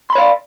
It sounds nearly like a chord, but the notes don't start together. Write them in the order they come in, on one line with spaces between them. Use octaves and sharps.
C6 B5 C#5 F5 D5